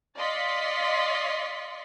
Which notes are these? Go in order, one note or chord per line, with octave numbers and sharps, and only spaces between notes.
D5 D#5 F5 C6 B6 C#7